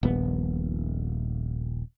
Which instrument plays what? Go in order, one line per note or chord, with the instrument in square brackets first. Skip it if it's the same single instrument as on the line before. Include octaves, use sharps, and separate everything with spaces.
[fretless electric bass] D#1 A#1 B3